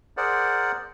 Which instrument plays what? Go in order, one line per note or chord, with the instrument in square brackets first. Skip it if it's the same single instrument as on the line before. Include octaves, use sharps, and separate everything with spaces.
[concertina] G#4 A#4 C5 D5 F#5